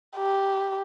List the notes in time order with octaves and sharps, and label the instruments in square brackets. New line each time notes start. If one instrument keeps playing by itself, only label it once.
[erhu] G4